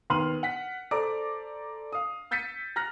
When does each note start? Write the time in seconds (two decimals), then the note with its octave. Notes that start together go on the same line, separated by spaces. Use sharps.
0.10 D#2 B3 C6 F6 D#7 F#7
0.43 F#5 B6
0.91 A4 C5 D5 A#5 D6
1.92 F5 D#6
2.31 E6 G6 A6 B6 C#7 D#7
2.76 A#5 F6 F#6 A#6